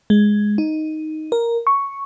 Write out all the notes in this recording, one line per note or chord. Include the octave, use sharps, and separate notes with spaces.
G#3
D#4
A#4
C#6